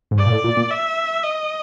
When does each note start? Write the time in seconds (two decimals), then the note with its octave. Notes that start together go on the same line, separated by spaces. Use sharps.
0.11 G#2
0.18 G2 D5
0.26 A#2
0.32 A2
0.44 A#2
0.57 A#2
0.71 E5
1.23 D#5